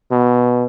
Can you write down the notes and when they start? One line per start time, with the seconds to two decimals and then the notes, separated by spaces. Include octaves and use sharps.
0.11 B2